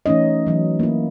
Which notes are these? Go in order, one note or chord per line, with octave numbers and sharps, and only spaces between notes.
E3 A3 C#4 D#4 D#5
E3 F#3
A#3 E4